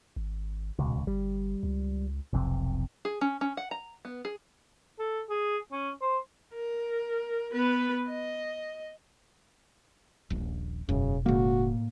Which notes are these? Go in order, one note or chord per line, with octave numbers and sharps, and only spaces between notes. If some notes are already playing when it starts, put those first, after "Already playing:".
G#1
D#1 C#2 B2
G1 G3
C#2
F1 B1 F2 C3
G#4
C#4
C#4
F#5
A#5
B3
G#4
A4
G#4
C#4
C5
A#4
B3 B4
D#5
D#1 A#1
E1 F#2 C#3
A2 C#3 G#3 A#3 F#4